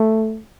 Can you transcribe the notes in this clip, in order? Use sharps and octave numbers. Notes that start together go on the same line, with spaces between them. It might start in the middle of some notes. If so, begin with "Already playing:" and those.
Already playing: A3